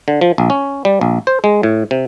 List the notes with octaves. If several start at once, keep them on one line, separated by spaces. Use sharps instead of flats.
D3
F3
A#1
C#4
G3
A#1
C5
G#3
A2
C3